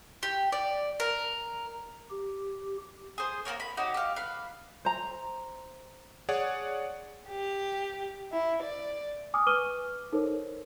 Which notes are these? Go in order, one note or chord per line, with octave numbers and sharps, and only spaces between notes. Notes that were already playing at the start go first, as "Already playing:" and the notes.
G4
D5
A#4
G4
G#4 C5
A#3 B3 A#4 C#5
B5
D#4 F#4 G4 C#5
G4 F5
B4 F5
C5 A#5
G#4 C#5 D5 F#5
G4
E4
D5
G#5 D6 D#6 F6
B4 C#6 D6 F6 D#7 G7
D#4 A4 A#4 C5 C#5